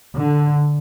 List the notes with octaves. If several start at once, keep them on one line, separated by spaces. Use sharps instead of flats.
D3